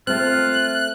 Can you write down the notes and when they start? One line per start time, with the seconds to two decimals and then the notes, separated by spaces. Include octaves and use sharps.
0.07 A3 C4 F4 F#6